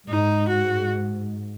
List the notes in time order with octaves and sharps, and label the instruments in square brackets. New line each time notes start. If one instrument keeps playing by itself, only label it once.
[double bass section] G#2 [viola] D#4
[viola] F#4